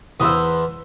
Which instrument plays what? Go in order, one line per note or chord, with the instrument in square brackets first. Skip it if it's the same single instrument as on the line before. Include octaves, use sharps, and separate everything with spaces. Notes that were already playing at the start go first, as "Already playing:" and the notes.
[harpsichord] E2 E3 C5 [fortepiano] D#6 E6